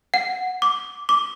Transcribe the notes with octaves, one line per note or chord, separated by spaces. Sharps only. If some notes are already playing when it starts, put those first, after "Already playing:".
F#5
D6
D6